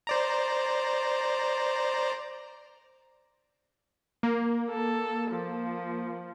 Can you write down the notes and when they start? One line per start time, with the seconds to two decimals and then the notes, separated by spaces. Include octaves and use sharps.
0.07 C5 D5 A#5
4.23 A#3
4.70 A4
5.32 F3